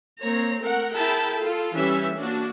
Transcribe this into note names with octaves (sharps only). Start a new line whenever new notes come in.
A#3 C4 C#5 A#5
A3 A#4 F#5
E4 G#4 A#4 G5 A5 B5
F4 A4
E3 G3 C#4 E5
A#3 D4 F#4